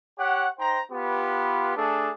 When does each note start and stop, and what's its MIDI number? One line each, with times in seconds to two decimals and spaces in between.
0.19 0.49 67
0.19 0.49 73
0.19 0.49 78
0.59 0.80 63
0.59 0.80 72
0.59 0.80 79
0.59 0.80 82
0.92 1.76 59
0.92 1.76 65
0.92 1.76 67
0.92 1.76 71
1.77 2.11 57
1.77 2.11 62
1.77 2.11 68
1.77 2.11 69